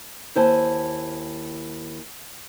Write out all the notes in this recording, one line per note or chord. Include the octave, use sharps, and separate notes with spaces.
D#2 E4 C5 G#5 A5